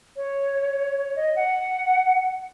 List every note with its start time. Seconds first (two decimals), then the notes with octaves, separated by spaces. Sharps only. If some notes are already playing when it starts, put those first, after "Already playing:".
0.16 C#5
1.16 D#5
1.36 F#5